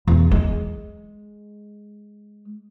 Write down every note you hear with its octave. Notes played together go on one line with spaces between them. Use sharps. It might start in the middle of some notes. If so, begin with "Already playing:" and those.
E2
G#3